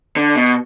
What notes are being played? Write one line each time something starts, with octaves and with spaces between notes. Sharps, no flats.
D3
B2